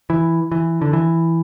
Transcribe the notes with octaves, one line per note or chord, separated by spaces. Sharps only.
E3
E3
D3
E3